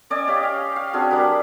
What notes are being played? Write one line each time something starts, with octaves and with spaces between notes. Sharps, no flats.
C#4 D5 D#5 G#5
C#4 G4 F5
F5
F5
C4 D4 F#4 G#4
G3 D4 A#4 B4